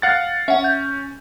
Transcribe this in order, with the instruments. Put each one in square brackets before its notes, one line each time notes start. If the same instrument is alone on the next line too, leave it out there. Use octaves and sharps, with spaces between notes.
[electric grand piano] F5 F#5 A6
[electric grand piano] C#4 [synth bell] E5 F#5
[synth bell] G6